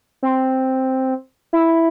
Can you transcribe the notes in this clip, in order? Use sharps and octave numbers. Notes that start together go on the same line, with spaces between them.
C4
E4